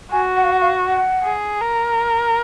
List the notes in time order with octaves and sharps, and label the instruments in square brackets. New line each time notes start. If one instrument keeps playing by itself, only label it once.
[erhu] F#4 [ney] G#5
[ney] F#5
F5
F#5
F5
F#5
[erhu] G#4
A#4